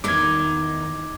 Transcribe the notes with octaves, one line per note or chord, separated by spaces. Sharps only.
E2 D#3 D#4 D6 G#6